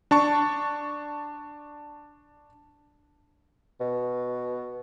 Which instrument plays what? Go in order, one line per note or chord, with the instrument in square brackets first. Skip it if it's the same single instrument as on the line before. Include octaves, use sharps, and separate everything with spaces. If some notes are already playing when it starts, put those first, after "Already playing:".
[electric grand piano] D4 A5 C#6
[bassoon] B2